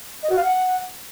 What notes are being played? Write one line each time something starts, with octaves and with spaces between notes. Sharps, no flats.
D#5
F#4
F5
F#5